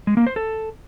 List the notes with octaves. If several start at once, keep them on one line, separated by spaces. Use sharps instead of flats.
G#3
A#3
C5
A4